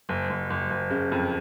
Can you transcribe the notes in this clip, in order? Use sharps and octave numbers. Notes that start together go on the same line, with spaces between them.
F#1
F#1
F#1
F#1
C#3
F2